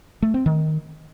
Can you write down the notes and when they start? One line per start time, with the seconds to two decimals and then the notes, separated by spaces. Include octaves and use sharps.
0.22 A3
0.34 C4
0.46 D#3